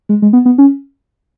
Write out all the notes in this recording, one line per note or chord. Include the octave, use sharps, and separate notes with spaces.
G#3
G#3
B3
B3
C#4